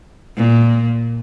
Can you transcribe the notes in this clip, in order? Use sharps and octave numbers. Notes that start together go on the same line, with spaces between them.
A#2